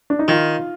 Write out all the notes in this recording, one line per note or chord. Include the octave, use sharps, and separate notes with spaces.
D4
D#4
D#3 F4